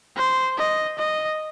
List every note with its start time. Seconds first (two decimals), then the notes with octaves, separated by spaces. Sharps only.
0.17 C5
0.58 D#5
0.98 D#5